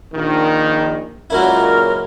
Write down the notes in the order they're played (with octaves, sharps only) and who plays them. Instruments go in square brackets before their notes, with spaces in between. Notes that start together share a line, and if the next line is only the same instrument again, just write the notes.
[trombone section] A#1 D#3
[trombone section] C#2 A#2 [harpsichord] F#3 C#4 E4 [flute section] A#4 A#5